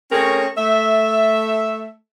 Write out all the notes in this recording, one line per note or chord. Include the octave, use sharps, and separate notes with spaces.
A3 C4 C#4 G#4 A#4 C#5
A3 E5